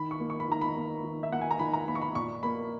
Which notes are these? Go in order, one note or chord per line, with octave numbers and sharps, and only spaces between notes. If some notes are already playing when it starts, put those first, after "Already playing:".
Already playing: D#3 B5
C#6
A#3
C#6
B5
D#3 A#5
B5
A#3
D#3
E5
A#3 F#5
G#5
A#5
D#3 B5
A#5
A#3 B5
C#6
B5
A#2 C#6
A#3 B5